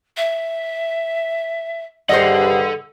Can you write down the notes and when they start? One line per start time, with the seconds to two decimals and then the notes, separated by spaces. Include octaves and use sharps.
0.17 E5
2.09 G2 G#4 A4 C5 D#5 F#5